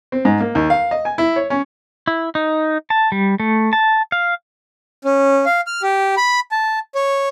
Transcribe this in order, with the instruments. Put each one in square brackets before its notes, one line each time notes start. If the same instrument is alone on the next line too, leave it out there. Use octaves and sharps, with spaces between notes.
[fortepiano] C4
G#2
A#3
D#2
F5
D#5
G#5
E4
C#5
C#4
[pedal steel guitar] E4
D#4
A5
G3
A3
A5
F5
[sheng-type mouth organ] C#4
F5
F6
G4
B5
A5
C#5